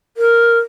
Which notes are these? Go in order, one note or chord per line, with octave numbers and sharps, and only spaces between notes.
A#4